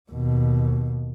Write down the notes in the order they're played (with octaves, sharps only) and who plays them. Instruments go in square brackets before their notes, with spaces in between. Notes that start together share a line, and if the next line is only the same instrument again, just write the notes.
[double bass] D#2 B2